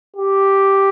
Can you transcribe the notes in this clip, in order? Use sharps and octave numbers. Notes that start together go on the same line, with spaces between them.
G4